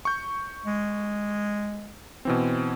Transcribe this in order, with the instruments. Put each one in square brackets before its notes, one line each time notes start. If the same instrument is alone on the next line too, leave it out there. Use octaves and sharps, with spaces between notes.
[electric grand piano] C#6 G6
[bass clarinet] G#3
[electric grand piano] B2 E3 C4